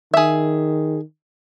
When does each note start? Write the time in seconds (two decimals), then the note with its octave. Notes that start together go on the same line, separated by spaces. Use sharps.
0.14 D#3 G#4 E5